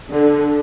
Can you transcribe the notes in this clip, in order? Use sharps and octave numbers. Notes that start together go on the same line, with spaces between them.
D3